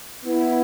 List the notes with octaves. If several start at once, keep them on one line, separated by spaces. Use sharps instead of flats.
B3 E4